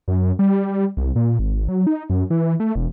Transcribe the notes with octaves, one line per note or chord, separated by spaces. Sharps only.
F#2
G3
C2
A#2
G#1
F#3
D#4
F#2
E3
A3
E1